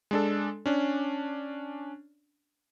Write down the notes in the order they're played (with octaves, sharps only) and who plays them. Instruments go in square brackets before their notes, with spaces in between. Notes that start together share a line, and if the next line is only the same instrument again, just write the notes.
[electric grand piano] G#3 D4 A4
C#4 D4